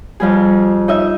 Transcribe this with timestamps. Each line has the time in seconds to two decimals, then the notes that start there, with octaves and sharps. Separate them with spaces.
0.20 F2 G3 G#4
0.88 D#4 D#5 E5